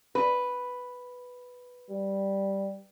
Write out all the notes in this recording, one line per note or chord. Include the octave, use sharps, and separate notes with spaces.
B4
G3